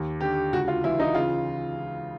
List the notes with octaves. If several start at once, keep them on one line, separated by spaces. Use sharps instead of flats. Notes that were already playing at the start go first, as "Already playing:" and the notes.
Already playing: D#2
D3 G4
C#2 F#4
F4
E3 E4
D#4
C#3 F4